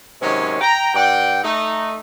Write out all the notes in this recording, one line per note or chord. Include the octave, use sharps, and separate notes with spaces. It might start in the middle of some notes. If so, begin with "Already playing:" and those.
C3 D#3 F#3 G#3 C#4
G5 A#5
G2 D5 F#5 G5
A3 D#4